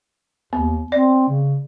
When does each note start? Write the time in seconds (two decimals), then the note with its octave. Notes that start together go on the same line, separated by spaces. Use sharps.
0.53 D#2 B3
0.92 C4 D5
1.29 C#3